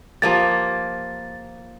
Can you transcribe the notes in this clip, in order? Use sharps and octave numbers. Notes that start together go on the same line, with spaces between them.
F3 A#3 G4 A6